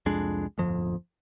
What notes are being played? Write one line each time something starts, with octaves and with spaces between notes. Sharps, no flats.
C2 F2 G#3 D4
D1 G1 F2 F3